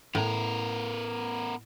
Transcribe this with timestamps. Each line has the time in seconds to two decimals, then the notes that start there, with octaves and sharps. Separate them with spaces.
0.15 A2 B3 A#4